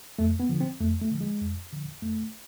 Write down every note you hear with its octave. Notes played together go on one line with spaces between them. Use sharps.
F2 A3
B3
D3 F3
C4
F2 A3
A3
D3 F3
G#3
F2
D3 F3
F2 A3